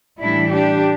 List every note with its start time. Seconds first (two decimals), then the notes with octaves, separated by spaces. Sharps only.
0.20 A2 E3 G3 D4 E4
0.52 D4 G4